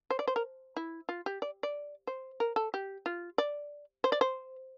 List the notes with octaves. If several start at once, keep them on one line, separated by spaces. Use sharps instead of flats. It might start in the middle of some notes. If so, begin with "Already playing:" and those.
C5
D5
C5
A#4
E4
F4
G4
D5
D5
C5
A#4
A4
G4
F4
D5
C5
D5
C5